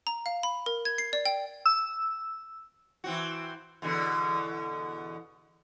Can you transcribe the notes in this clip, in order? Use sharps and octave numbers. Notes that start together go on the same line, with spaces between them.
A#5
F5
B5
A#4
G#6
C7
D5
G5
E6
E3 C4 F#4
E2 B2 D3